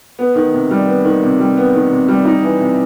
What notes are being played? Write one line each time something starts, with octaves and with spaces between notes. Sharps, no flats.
B3
D#3
C3
G3
B3
D#3
C3
G3
B3
D#3
C3
G3
D#4
E3
C3